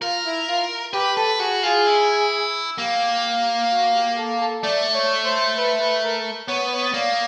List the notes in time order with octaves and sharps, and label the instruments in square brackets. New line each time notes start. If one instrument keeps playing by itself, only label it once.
[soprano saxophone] F4 [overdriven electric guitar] A#4
[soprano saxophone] E4
F4
[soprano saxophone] G4 [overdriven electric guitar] B4
[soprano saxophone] A4 [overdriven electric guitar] B4
[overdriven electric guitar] F#4 [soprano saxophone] G#4
[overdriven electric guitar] F4 [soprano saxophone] G#4
[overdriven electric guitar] E4
[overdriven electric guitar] A#3 [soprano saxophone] G4
[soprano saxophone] F#4
G4
A4
A4
[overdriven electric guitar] A3 [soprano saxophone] D5
[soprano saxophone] C#5
C5
B4
B4
A#4
[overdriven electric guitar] B3 [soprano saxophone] C#5
[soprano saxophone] C#5
[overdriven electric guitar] A#3 [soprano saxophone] D5